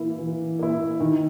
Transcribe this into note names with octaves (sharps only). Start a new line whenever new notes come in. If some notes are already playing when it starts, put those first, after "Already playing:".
Already playing: E3 A#3 E4
E3
A#3 E4
D#3